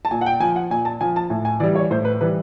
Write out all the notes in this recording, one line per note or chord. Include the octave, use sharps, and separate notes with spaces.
A5
A#2 G#5
F#5
G5
F3 G#5
F#5
A#2 G#5
A5
F3 G#5
A5
A2 G#5
G#5
E3 G3 D5
C#5
A2 C5
B4
E3 G3 B4